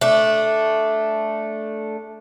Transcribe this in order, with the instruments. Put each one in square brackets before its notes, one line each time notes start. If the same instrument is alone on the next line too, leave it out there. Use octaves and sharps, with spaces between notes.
[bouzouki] A3 D4